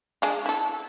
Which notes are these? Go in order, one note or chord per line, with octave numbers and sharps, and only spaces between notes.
G#3 D4 F4
E4 A4